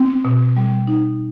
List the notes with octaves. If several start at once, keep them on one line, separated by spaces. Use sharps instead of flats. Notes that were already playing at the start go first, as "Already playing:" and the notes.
Already playing: C4
B2
G3
D#4